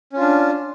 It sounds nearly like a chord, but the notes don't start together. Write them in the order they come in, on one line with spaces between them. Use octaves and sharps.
C#4 F4 D4